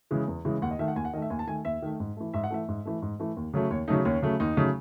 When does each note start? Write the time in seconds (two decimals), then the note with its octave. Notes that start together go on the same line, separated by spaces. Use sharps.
0.11 C#3 E3 G#3
0.28 E2
0.45 C#3 E3 G#3
0.62 D#2 F#5
0.71 D#5
0.79 D#3 A3 E5
0.88 F#5
0.96 D#2 G#5
1.05 F#5
1.13 D#3 A3 D#5
1.22 E5
1.30 D#2 G#5
1.39 A5
1.47 D#3 A3 G#5
1.65 D#2 E5
1.82 D#3 A3
2.00 G#2
2.17 E3 A3
2.34 G#2 E5
2.44 F#5
2.50 E3 A3 E5
2.68 G#2
2.85 E3 A3
3.02 G#2
3.19 E3 A3
3.37 D#2
3.54 C#3 F#3 A3
3.70 D#2 C#5
3.88 C#3 F#3 A3 D#4
4.05 D#2 C#4
4.23 C#3 F#3 A3
4.40 D#2 D#4
4.57 C#3 F#3 A3